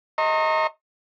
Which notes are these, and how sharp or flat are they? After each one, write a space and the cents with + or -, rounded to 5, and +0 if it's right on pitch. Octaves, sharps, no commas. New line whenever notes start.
D#5 +20 A#5 -25 C#6 -45